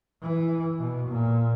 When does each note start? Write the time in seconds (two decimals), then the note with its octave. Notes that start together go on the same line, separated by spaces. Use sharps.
0.22 E3
0.79 B2
1.08 A#2